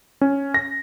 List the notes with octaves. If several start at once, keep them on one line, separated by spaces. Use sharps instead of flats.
C#4
A#6